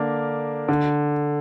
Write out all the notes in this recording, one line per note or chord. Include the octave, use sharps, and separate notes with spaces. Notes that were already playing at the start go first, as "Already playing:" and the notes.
Already playing: D3 A#3 D4 A#4
D3